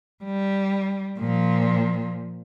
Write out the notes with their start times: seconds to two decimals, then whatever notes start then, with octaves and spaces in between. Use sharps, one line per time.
0.24 G3
1.18 A#2 F3